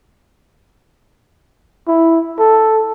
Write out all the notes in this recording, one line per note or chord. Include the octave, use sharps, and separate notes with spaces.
E4
A4